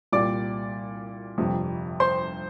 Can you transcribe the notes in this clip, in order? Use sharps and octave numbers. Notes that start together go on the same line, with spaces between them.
C2 A#2 G3 D5 D6
G1 F2 C3 G3
C5 C6